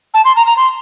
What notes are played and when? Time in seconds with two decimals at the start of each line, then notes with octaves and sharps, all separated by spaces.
0.14 A5
0.25 C6
0.36 A#5
0.46 A#5
0.57 C6